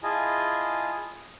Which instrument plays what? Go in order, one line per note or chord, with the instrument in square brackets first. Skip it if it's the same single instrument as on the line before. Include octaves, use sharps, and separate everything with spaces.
[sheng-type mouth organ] E4 F4 G#4 D#5 G#5 A5